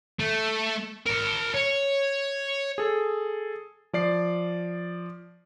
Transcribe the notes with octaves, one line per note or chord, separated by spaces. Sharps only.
A3
A#4 A5
C#5
G#4 A4
F3 D5 C7